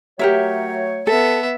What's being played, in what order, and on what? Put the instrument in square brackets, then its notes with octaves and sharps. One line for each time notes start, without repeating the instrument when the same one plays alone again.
[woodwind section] F#3 A3 C#5 [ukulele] G4 A#4 E5
[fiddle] B3 E5 [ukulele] A4